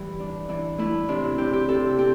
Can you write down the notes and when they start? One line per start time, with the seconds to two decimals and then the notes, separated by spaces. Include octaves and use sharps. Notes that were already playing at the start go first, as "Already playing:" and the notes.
Already playing: A2 E3 G3 G4
0.19 D4
0.49 E3 D4
0.78 A3 E4
1.09 C3 D4
1.24 E4
1.38 C3 G4
1.53 G4
1.68 C3 A4
1.98 C4 G4